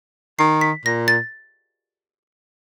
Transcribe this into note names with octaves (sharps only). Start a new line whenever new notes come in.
D#3 C7
B6
A#2 A#6
A6